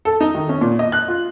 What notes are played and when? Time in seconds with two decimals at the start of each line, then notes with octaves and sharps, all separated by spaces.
0.05 A4
0.20 D#4
0.35 D#3
0.49 C#4
0.61 A#2
0.79 D#5
0.92 F#6
1.08 F4